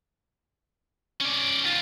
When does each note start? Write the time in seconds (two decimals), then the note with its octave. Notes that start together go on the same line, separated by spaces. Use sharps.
1.20 C#4 D5
1.64 D#3 F4